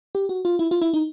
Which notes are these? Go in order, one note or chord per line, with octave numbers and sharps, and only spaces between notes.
G4
F#4
F4
E4
F4
E4
D#4